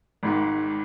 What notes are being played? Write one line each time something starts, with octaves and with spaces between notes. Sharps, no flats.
G#1 G#2 D#3